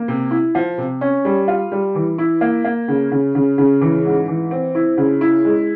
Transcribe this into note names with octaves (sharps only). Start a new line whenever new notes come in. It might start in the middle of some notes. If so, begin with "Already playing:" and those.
Already playing: A#3
C3
E4
F3
C3
C#4
G3
F4
G3
E3
E4
A#3
A#3
C#3
C#3
C#3
C#3
E3
G#2
E3
C4
E4
C#3
E4
G#3